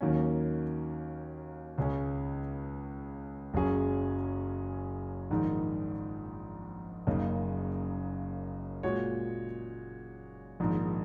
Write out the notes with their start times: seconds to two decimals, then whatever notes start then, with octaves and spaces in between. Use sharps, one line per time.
0.01 D#2 D#3 F#3 A#3 C#4
1.78 C#2 C#3 G#3 C#4
3.54 F#1 F#2 F#3 C#4 G#4
5.31 A#1 G#2 D#3
7.07 F#1 F#2 C#3 A#3 D#4
8.83 A#2 G#3 F#4 C#5
10.60 A#1 G#2 D#3